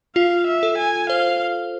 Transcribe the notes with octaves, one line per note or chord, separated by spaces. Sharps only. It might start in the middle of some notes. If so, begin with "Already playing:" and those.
F4 F5
E5
A4
G#5
C5 F5